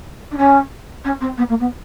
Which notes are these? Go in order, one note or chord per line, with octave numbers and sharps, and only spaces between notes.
D4
C#4
C#4
C4
B3
A#3
B3